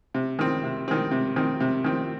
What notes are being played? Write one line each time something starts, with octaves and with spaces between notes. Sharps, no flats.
C3
D#3 C4
C3
D#3 C4
C3
D#3 C4
C3
D#3 C4